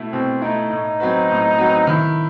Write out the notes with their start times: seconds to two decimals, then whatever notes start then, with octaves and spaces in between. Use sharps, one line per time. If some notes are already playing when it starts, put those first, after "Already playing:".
Already playing: B2 A3 E4
0.12 B2 C4
0.42 A3 D#4 E4
0.70 A2
1.00 F#3 C4 F#4 B4
1.29 A2
1.58 F#3 C4 F#4 B4
1.87 D#3 E4